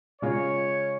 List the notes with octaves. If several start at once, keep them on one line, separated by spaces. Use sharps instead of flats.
C#3 G#3 C#4 F4 C#5